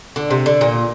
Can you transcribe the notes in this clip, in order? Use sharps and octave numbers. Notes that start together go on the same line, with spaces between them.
D3
C3
D3
A#2